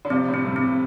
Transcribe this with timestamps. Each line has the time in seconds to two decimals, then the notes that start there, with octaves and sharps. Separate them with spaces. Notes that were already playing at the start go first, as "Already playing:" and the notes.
0.05 D3
0.10 C3 F3 C4
0.28 A2 D3
0.34 C4
0.45 G2 C3
0.56 C4
0.63 C3